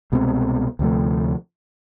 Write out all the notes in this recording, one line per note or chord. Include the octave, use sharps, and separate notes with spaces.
C2 B2 G#3 C4
D2 C3 F3 A3